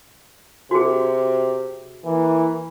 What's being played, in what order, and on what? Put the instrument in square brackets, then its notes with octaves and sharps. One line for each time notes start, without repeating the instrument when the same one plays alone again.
[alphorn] C3 [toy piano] F#4 G#4
[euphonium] E3 [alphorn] A#3